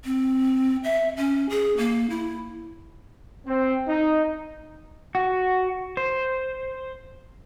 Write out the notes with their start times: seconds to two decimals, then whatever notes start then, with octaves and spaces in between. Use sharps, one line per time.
0.05 C4
0.84 E5
1.17 C#4
1.49 G#4
1.77 A#3
2.10 E4
3.47 C4
3.87 D#4
5.15 F#4
5.97 C5